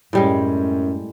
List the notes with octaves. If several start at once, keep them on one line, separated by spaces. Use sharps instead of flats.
F#2 A2 G3 G#3